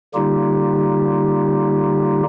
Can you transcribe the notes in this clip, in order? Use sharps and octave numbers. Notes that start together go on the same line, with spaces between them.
D3 G3 A#3 D#4 F4 G4